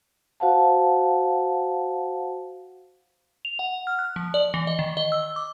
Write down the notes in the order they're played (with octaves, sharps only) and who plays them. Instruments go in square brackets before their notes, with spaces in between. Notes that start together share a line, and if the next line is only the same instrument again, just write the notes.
[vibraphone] F#4 C5 F5 F#5 A5
[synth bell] F7
F#5
F6
F#6
F3
D5
E3
D#5
D#3
D#5
E6
D6